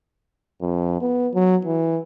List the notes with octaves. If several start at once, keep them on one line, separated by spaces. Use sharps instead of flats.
F2
B3
F#3
E3